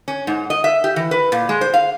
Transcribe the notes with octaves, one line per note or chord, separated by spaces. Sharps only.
C#4
G#2
D#5
E5
G4
E3
B4
A#2
G#3
C5
F5